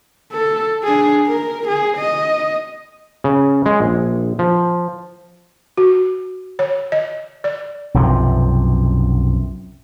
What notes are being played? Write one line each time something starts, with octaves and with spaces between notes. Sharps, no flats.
A4
D4 G#4
A#4
G#4
D#5
C#3
G#3
A#1
F3
F#4
C#5
D#5
D5
B1 F#2 C3 F3